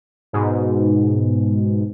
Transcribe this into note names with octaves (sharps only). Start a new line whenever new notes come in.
G#2 B2